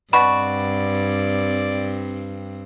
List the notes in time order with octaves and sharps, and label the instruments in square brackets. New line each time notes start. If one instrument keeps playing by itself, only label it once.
[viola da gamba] G2 C4 [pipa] B2 F#4 [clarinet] D5 [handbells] B5